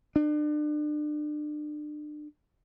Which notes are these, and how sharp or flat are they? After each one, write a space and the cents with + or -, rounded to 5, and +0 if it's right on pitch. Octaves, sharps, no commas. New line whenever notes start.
D4 +35